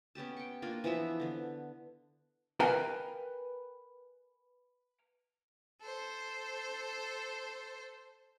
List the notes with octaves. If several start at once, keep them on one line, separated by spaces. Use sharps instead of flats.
B3 C#4 G4 A5
G5 C#6
A#3 D4 F4
E3 F3 B3 E5
D3 B3
A#4 B4 F5 G5 G#5 A#5
A4 C5